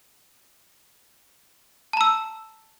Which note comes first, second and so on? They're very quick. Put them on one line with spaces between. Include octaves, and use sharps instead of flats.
A5 A#5 E6